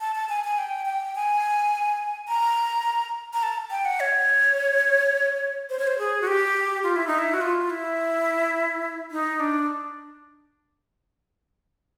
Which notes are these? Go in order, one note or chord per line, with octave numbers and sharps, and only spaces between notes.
A5
A5
G#5
G#5
G5
G5
G#5
A#5
A#5
A5
G5
F#5
C#5
C5
C#5
C5
G#4
F#4
G4
F4
E4
D#4
E4
F#4
F4
E4
D#4
D4